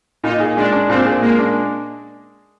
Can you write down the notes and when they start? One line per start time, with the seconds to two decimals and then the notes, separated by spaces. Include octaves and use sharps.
0.23 A#2 D#4
0.40 G#4
0.57 G#3 D4
0.73 D4
0.89 A#2 C4
1.06 G#4
1.22 G#3 A#3
1.39 D4